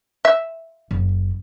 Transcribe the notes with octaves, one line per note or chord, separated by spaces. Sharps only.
E5
F#1